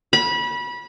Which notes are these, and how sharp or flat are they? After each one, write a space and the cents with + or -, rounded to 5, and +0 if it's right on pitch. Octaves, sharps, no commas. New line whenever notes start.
B5 -25